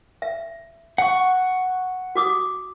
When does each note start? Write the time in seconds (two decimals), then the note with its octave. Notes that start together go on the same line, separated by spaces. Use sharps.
0.22 E5
0.98 F#5 C#6
2.15 F#4 D6 D#6